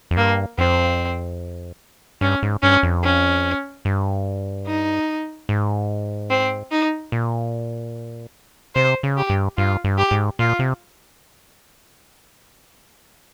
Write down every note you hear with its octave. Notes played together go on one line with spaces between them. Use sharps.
F2
G2 A#3
F2 C4
G2 C#4
G#2
G2 C#4
F2
C#4
G2
D#4
G#2
C4
D#4
A#2
C3 C5
C#3
G4
G2
G2 F4
G2
G4
G#2
A#2 F4
C3